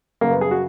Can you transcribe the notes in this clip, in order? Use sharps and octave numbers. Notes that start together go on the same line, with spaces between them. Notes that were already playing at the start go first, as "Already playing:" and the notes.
F#2 C#3 A#3
B3
G#4
F#4